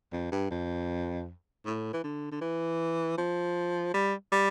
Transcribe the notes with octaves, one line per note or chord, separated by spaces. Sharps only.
F2
G2
F2
A2
E3
D3
D3
E3
F3
G3
G3